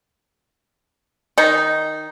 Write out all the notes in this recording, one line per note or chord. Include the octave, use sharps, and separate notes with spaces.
D#3 D#4